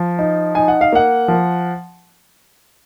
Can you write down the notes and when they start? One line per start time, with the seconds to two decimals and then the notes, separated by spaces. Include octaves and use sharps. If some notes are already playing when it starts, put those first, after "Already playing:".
Already playing: F3
0.19 D#4
0.55 D#4 G#5
0.68 F#5
0.81 F5
0.93 A#3 F#5
1.28 F3